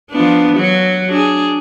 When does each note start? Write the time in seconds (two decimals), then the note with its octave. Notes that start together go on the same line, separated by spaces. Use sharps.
0.11 F3 B3 D4
0.56 F#3 F#4
1.09 D4 G#4